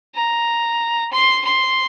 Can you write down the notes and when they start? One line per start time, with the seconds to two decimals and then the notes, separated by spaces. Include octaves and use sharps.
0.15 A#5
1.12 C6
1.45 C6